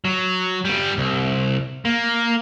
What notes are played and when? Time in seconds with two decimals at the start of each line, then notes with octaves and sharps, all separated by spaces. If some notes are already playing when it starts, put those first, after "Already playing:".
0.05 F#3
0.65 G3 B3
0.98 C2
1.85 A#3